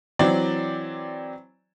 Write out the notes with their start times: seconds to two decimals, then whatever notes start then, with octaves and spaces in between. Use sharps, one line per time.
0.19 E3 F#3 C4 D5